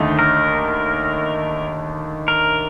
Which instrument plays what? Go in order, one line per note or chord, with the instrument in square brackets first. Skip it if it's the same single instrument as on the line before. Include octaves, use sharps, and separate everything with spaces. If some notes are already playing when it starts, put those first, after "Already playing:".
Already playing: [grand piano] D#2 D3 A3 D#4
[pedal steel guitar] A#4
A#4